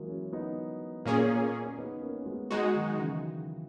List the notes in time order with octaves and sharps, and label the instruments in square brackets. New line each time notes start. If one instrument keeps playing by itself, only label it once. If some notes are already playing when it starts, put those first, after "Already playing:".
Already playing: [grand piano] E3 F#3 G#3 A#3
C#4 E4
B3 D#4
[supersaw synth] A#2 A#3 C#4 G#4
[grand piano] C#4
B3 D#4
A#3 C#4
C#4
G#3 B3
[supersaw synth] G#3 D#4 F#4
[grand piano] D#3 F#3
C#3 E3